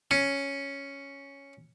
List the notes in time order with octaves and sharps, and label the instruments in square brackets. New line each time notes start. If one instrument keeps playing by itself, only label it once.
[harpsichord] C#4